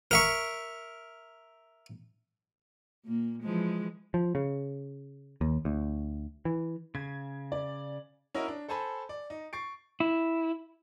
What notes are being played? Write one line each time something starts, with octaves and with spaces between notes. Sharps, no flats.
A#4 E5 C#6
A#2 A#3
E3 F3 G#3
F3
C#3
D#2
D2
E3
C#3 G#6
D5
C#4 E4 F#4 A#4 D#5
D4
A4 C5 G#5 A5 B5
D5
D#4
C#6 A6 C7 D7
E4